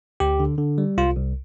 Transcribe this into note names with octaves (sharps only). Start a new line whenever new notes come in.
D2 G4
D3
D3
G3
C2 F4
C2